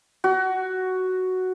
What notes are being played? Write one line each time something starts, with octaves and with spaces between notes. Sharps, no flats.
F#4